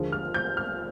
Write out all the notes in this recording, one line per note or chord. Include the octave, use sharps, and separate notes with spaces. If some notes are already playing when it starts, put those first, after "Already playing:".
Already playing: D#2 D3 F3 G#3
F6
G6
F6